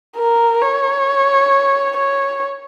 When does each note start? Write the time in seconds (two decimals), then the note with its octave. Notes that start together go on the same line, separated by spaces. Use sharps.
0.17 A#4
0.62 C#5
1.96 C#5